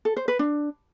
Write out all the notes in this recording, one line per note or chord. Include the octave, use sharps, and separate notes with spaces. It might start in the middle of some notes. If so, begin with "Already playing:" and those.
A4
C5
B4
D4